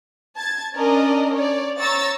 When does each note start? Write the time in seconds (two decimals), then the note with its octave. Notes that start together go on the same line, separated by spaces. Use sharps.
0.36 A5 G#6 A6
0.76 C#4 D4 A#4 D5 D#5
1.32 C#5 D5
1.78 C#5 A#5 C#6 E6 A6